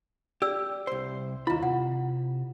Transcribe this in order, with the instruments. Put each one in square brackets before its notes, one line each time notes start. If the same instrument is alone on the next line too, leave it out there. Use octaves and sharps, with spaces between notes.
[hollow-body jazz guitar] G4 [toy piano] D5 E6
[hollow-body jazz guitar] C2 C5
[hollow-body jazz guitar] D#2 B5 [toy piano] E4 F4 A#5
[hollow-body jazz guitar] C3 [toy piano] F#5